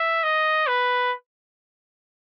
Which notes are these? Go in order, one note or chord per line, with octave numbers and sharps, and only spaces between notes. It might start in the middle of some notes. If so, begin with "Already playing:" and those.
Already playing: E5
D#5
B4